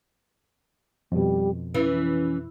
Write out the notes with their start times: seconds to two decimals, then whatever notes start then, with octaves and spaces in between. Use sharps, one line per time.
1.12 F2 B2 G3
1.74 E3 C#4